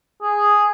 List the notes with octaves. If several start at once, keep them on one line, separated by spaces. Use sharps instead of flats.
G#4